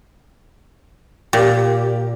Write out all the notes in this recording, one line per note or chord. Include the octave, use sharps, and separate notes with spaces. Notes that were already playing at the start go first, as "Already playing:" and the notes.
A#2 G4